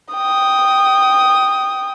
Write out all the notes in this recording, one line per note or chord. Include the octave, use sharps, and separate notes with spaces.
G5 D#6